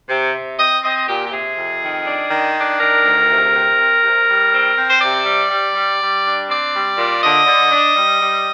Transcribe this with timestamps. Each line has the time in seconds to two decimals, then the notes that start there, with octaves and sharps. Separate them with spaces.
0.09 C3
0.34 C3
0.58 C4 D#5
0.83 C4 D#5
1.08 A#2 G4
1.26 G4
1.32 C3 G#4
1.57 F2
1.81 D#3
2.06 D4
2.31 D#3
2.56 D4
2.80 D#3 A#4
3.04 D2
3.29 C3
3.53 C4
3.78 C4
4.02 C3
4.28 G3
4.51 C4
4.77 C4
4.89 C5
5.01 C3 D5
5.26 G3
5.50 G3
5.75 G3
6.00 G3
6.24 D4
6.49 C4 D5
6.73 G3
6.98 A#2
7.23 D3 D#5
7.47 D3
7.71 D4
7.96 G3
8.21 G3